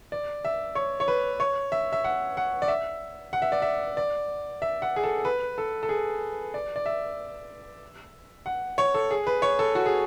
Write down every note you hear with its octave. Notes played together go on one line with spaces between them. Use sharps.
D5
E5
C#5
C#5
B4
C#5
E5
E5
F#5
F#5
D5
E5
F#5
E5
D5
E5
D5
E5
F#5
G#4
A4
B4
A4
A4
G#4
D5
D5
E5
F#5
C#5
A4
G#4
B4
C#5
A4
F#4
G#4